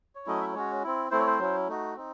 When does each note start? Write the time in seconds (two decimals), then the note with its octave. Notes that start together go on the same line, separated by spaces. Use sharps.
0.15 C#5
0.26 F#3 A3 C#4 E4 D#5
0.41 E5
0.54 G#3 C#4 F#4 C#5
0.83 C4 E4
1.11 A3 C4 E4 C5
1.19 C#5
1.27 C5
1.39 F#3 C#4 E4
1.68 A3 D#4 F#4
1.96 C4 D#4